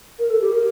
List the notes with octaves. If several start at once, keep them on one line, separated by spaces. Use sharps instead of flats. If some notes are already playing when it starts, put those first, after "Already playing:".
A#4
A4
G4
A#4